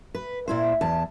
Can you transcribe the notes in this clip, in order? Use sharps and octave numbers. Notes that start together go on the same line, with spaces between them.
B4
A#2 E4 C5
E2 A5